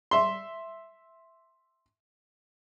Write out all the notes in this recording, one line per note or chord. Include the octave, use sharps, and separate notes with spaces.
E5 C6